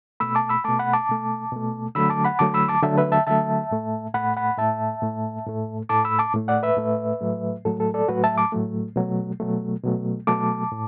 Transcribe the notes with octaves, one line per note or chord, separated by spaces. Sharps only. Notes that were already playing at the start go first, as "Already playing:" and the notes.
B2 A3 B5 E6
A5 D6
B5 E6
B2 A3 A5 D6
F#5 B5
A5 D6
B2 A3
B2 A3
D3 F#3 A3 B5 E6
A5 D6
F#5 B5
D3 F#3 A3 A5 D6
B5 E6
A5 D6
D3 F#3 A3 E5 A5
B4 E5
E5 A5
D3 F#3 A3 E5 A5
A2 A3
A2 A3 F#5 B5
F#5 B5
A2 A3 E5 A5
A2 A3
A2 A3
A2 A3 A5 D6
B5 E6
A5 D6
A2 A3
D5 F#5
B4 E5
A2 A3
A2 F#3 A3
A2 F#3 A3 A4
A4
A4 D5
A2 F#3 A3 F#4 B4
E5 A5
A5 D6
A2 F#3 A3
B2 F#3 A3
B2 F#3 A3
B2 F#3 A3
B2 F#3 A3 A5 D6
A2